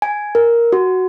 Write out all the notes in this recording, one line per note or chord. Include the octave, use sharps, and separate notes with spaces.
G#5
A#4
F#4